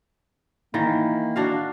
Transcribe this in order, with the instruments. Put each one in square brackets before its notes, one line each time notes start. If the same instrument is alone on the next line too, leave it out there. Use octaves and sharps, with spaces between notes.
[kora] D#3 E3 [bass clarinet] A#3
[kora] D4 F#4 F5